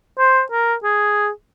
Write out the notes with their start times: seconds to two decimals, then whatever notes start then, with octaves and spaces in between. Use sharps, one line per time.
0.19 C5
0.52 A#4
0.84 G#4